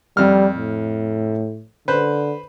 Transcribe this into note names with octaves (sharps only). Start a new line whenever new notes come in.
F2 G3 F6
A2
D3 B4 C5